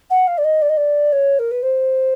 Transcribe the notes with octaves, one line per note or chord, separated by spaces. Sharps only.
F#5
F5
D5
D#5
D5
D#5
D5
C#5
A#4
B4
C5